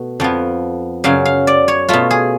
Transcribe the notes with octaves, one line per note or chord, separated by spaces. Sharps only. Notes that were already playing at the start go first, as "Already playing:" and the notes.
Already playing: B2 A3
F2 F3 B3
F#2 C#3 F#3 F5
F5
D5
C#5
B2 A3 F4
G#4